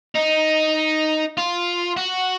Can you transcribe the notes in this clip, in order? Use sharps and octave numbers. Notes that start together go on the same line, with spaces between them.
D#4
F4
F#4